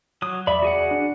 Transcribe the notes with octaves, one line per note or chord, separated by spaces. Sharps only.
F#3 D#6
E2 D5 E5 B5
F#4 G#4 F#5
D4